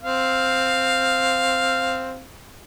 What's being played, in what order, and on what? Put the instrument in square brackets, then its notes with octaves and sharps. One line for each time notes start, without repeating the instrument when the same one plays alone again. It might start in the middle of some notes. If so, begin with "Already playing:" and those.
[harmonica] C4 F5